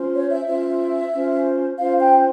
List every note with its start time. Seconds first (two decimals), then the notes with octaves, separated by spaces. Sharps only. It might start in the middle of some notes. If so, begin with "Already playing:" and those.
Already playing: C#4 F4 C5
0.14 C#5
0.30 E5
0.47 C#4 F4 C5 E5
1.12 C#4 F4 C5
1.77 C#4 F4 C5 F5
1.99 G5